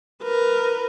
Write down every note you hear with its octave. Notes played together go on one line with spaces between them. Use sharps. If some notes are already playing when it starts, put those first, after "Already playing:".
A#4 B4